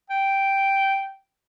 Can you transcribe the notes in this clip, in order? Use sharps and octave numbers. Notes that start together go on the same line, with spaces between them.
G5